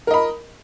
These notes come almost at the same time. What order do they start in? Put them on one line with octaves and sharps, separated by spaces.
A#4 D#5 B5